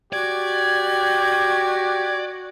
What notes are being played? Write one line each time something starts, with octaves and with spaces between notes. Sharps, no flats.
F#4 G4 D5 G#6